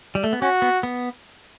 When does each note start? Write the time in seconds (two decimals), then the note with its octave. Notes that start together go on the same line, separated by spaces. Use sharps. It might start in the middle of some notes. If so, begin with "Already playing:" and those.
0.15 G3
0.24 A3
0.33 B3
0.42 C#4 F#4
0.62 B3
0.83 B3